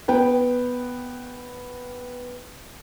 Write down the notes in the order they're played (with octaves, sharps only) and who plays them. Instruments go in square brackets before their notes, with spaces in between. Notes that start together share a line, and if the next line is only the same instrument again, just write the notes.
[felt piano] B3 B4 G5